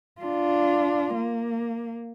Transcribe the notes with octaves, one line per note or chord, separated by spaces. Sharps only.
D4 F4
A#3